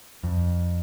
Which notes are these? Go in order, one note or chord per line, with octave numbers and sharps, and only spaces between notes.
F2